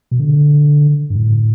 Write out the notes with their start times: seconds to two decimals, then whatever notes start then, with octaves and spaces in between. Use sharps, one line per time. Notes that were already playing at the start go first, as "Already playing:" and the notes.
0.11 B2
0.20 D3
1.10 G2
1.15 A2